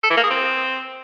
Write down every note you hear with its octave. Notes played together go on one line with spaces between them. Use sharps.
A4
E3
A#3
G#4
C4